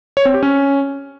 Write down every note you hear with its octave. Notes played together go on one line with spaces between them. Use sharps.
C#5
C4
G4
C#4